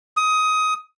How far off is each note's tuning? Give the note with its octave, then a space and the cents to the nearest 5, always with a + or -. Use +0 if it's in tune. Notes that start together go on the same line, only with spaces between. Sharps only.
D#6 +15